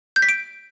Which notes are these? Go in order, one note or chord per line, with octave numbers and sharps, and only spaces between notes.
G6
B6
D7